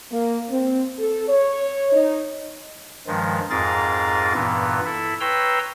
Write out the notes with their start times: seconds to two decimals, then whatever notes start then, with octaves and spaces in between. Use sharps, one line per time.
0.10 A#3
0.50 C4
0.98 A4
1.28 C#5
1.92 D#4
3.07 G2 D#3 F3 G#3
3.50 F2 G#2 F4 G#4 A#4 A6
4.34 G2 A#2 E3 B3
4.85 E4 A4 E5
5.20 B4 C#5 G5 A#5 C6 E6